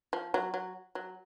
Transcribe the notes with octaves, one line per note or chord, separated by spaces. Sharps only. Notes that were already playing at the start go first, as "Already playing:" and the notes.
F3
F#3
F#3
F#3